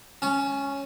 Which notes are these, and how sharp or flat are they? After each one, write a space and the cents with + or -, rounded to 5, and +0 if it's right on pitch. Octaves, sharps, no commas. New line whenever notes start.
C#4 +0 A5 -45